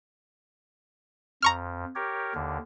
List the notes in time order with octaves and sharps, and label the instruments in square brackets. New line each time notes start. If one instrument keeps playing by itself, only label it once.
[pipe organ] F2 [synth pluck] A#5 C#6 F6
[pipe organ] G4 A#4 C#5
D#2 D3